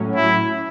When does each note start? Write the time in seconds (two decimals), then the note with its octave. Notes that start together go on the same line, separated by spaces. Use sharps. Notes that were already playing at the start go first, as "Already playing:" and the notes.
Already playing: A2 F#3 C#4
0.16 E4